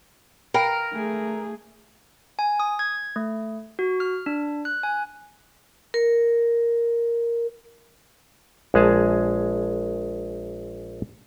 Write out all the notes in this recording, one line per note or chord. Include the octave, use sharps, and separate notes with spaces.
A#4 F5 G5 B5
A3 G#4
G#5
D#6
G#6
A3
F#4
F6
D4
F#6
G#5
A#4
A#1 G#3 G#4 A5